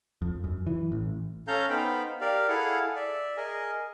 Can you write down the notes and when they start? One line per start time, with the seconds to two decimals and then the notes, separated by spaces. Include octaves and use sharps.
0.22 F2
0.44 F#2
0.67 E3
0.92 A1
1.48 C#4 A4 F5 A#5 G6
1.70 B3 D#4 C5 F5 G5 B5
2.21 G4 A#4 D5 F5
2.48 E4 G#4 A4 F5 F#5
2.96 D5 E5
3.37 G#4 A#4 D#5 G#5